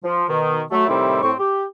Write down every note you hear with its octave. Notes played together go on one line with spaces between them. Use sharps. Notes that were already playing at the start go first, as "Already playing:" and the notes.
F3
B2 D#3
F#3 A3
A2 C3 D#3 G3 C4 E4
A2 C4 C#6
G4